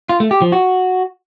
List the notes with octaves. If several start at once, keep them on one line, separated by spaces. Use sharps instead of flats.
F4
A3
G4
F3
F#4